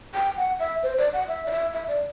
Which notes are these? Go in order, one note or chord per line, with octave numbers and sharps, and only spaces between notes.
G5
F#5
E5
C5
D5
F#5
E5
D5
E5
E5
D5